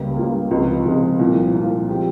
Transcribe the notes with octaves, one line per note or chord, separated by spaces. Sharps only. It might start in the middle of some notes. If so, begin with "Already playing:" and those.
Already playing: C#2 C#3 G3 A#3
C#2 C#3 G3 A#3
C#2 C3 F3 G#3 D#4
C#2 C3 F3 G#3 D#4
C2 A#2 F3
C2 A#2 F3
F3 G#3 C4 G4